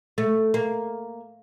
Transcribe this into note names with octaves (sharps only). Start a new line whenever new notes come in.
A3
A#3